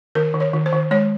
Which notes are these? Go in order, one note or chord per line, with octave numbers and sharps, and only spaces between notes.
D#3 A#4
D#3
C#5
D#3
C5
D#3
G#3 C#5